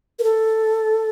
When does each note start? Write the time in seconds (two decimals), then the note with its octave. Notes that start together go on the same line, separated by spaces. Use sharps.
0.19 A#4
0.23 A4